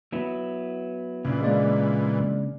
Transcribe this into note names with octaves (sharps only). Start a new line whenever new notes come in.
F#3 B3 E4
A#2 C#3 E3 D4
G#3 A#3 D5